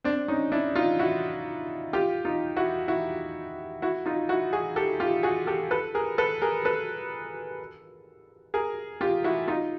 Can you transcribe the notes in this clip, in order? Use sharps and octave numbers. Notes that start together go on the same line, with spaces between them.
C4 D4
C#4 D#4
D4 E4
D#4 F4
E4 F#4
F4 G4
D#4 F4
E4 F#4
E4 F#4
E4 F#4
D#4 F4
E4 F#4
F#4 G#4
G4 A4
F4 G4
F#4 G#4
G4 A4
A4 B4
G#4 A#4
A4 B4
G#4 A#4
A4 B4
G#4 A#4
F4 G4
E4 F#4
D#4 F4